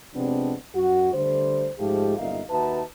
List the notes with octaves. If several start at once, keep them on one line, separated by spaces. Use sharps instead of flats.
C3 F3 G#3 B3 C4 D4
F#2 F#4
D3 G3 A3 C5
G#2 F3 G#3 A3 F4 G4
G1 F#2 A#2 D#4 E5 F5
D#2 D#4 F#4 B4 E5 A5